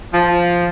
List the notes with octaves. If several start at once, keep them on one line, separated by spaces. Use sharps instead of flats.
F3